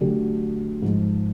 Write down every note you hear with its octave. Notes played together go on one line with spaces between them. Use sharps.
D3 F#3 A3 D4 G4
G#2 F3 G#3